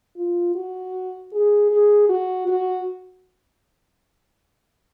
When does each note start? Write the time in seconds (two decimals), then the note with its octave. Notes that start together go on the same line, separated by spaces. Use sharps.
0.17 F4
0.55 F#4
1.33 G#4
1.71 G#4
2.09 F#4
2.47 F#4